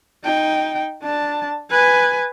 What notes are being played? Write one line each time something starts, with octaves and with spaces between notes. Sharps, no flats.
D#4 G5
D4 A5
B4 G#5